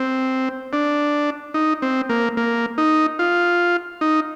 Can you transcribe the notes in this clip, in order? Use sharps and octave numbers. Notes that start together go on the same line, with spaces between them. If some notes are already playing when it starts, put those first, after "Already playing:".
Already playing: C4
D4
D#4
C4
A#3
A#3
D#4
F4
D#4